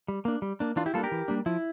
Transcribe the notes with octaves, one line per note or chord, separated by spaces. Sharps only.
G3
A#3 D4
G3
A#3 D4
E3 D4 F4
E4 G4
G3 A#3 D4 F4 A4
G4 A#4
E3
G3 A#3 D4
F3 E4